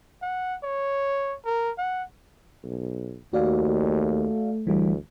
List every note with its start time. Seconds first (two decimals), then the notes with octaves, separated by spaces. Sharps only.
0.22 F#5
0.63 C#5
1.45 A#4
1.78 F#5
2.64 B1
3.33 D#2 A3 F#4 D5 F5
4.67 D2 E3 G3